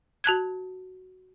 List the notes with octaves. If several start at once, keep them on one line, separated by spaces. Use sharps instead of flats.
F#4 A5 F#6 G#6